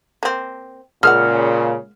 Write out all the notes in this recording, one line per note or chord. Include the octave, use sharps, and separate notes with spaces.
A#3 C4
A#2 C#3 G#3 A#3 F#5 F6